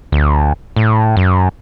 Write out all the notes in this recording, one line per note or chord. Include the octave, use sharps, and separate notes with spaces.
D2
A2
F#2